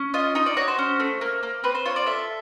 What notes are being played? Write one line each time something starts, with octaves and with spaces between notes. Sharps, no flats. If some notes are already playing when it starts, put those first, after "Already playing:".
Already playing: C#4
F4 D#5
D#4 D#5
D5
F#4 C#5
C5
C#4
A3
A#3
A#3
C4 B4
C5
F4 C#5
D5
A4 E5